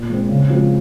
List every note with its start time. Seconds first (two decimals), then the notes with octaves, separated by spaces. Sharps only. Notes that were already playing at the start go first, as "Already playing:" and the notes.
Already playing: A#2
0.09 G#3 C4
0.29 C#3
0.50 F3 G#3 C4